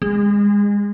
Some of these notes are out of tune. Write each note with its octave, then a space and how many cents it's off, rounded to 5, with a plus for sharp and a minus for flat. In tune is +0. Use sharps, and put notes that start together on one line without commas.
G#3 -25